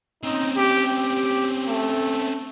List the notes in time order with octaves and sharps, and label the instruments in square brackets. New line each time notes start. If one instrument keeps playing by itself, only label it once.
[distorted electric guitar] C4 C#4 [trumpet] D#4
[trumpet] G4
G4
A3